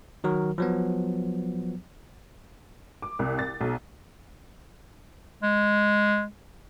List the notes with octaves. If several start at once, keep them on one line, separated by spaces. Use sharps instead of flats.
D#3 F#3 F#4 A#4
F3 F#3 B3
D6
C2
A6
B1
G#3